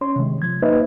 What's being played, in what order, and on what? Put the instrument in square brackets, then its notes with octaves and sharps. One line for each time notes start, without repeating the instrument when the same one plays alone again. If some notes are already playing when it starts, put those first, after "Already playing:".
[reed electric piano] C#4 C#5 C6
C3 D#3 G#3
C3 F3 G#6
A#3 D#4 B4 C5 D#5 E5